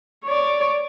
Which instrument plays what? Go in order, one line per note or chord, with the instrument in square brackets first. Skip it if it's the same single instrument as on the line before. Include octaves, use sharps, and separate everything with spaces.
[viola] C#5 D5